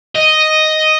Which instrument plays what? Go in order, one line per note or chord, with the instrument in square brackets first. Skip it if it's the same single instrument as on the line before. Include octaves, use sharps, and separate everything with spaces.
[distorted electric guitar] D#5